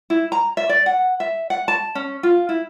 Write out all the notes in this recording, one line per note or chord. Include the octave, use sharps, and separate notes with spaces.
E4
A#5
E5
D5
F#5
E5
F#5
A5
C#4
F4
E4